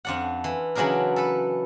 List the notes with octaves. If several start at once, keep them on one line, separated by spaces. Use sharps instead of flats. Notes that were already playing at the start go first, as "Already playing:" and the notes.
F2 D4 F#5
E3
C#3 E3 F#3 D4 G#4 A#4
A4 B4